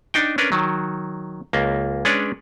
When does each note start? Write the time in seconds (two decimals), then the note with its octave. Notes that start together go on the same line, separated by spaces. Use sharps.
0.14 D4 D#4 G5
0.38 C#4 D4 A#4 B4
0.52 D#3 F#3
1.53 C#2 A#3
2.05 G#3 C#4 D4 B4 C#5 D5